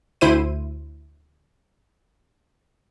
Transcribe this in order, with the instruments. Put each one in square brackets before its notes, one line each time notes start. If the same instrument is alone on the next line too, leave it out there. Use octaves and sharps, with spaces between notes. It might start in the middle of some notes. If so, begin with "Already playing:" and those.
[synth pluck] D2 E4 C5 D#7